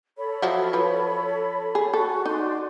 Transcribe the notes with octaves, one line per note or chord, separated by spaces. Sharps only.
A4 C#5 B5
F3 F#3 E5
F3 B4
G#4
F#4 A4 C#6
D#4 F#4 D5 C6